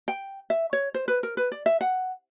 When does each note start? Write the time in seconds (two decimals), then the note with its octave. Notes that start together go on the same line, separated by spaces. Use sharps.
0.08 G5
0.50 E5
0.73 C#5
0.94 C5
1.08 B4
1.23 A#4
1.37 B4
1.52 D5
1.66 E5
1.81 F#5